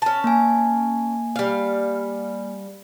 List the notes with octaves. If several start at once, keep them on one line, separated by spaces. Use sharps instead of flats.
C#4 A5
A#3 G#5
G3 F5